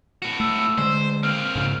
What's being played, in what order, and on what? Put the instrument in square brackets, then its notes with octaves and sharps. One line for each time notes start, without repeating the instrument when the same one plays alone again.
[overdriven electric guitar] A2 F#4
[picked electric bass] A3 [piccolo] E6
[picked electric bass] D3 G#3 [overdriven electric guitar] C5
[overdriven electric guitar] A#3 C4 [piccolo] F6
[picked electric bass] G#2 C#3